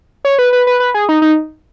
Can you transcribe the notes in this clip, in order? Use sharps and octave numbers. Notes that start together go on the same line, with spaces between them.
C#5
B4
B4
B4
B4
G#4
D#4
D#4